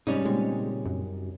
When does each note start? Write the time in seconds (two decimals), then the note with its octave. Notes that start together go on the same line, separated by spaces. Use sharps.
0.07 G#2 C3 G3 C#4 D#4
0.25 A#2 C#3 G#3 C4
0.86 F#2